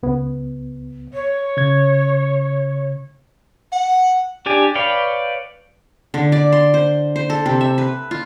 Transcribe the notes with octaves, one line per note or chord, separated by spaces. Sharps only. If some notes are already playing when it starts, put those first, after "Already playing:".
C#2 B3
C#5
C#3 G#6
F#5
D4 G4 D5 G#5
B4 C#5 D5 F5 G5
D3
D5
C6
C5
C5
A4
C3
E5
B4
F4